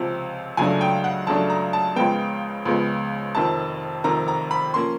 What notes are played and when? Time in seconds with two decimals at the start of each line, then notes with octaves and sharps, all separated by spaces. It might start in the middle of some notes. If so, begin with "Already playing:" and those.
Already playing: C#2 C3 F3
0.57 C#2 C#3 F#3 A3 D4 G#5
0.81 G5
1.04 F#5
1.27 C#2 C#3 F#3 A3 D4 A5
1.50 A#5
1.73 A5
1.96 C#2 C#3 F3 G#3 B3 G5
2.65 C#2 C#3 F3 G#3 B3
3.35 F1 F2 C3 D#3 A5
4.04 F1 F2 C3 D#3 A#5
4.28 A#5
4.51 B5
4.74 F3 A#3 C#4 C6